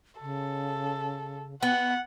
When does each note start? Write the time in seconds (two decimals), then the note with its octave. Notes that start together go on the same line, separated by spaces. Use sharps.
0.21 C#3 A4
1.63 B3 F#5